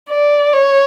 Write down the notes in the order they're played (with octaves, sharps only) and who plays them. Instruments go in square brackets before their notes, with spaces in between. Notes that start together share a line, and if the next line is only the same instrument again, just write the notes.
[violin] D5
C#5